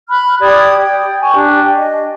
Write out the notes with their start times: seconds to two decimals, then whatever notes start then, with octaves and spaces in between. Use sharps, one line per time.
0.09 B5 F6 F#6
0.41 G4 D5 D#6 G#6
0.80 G5
1.21 G#5 C#6
1.35 D4 G4
1.75 D#5